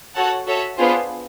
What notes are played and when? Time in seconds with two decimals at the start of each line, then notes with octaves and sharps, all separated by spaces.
0.15 F#4 A4 C#5 F#5 A5
0.47 F#4 A4 C#5 E5
0.78 B3 D4 F4 G#4 C5